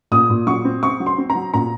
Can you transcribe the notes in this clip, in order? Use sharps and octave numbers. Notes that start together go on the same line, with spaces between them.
A#2 D#6
A#2
F#3 C#6
C4
C4 C#6
F#3
C6
C4
A#5
F#3
A#2 A#5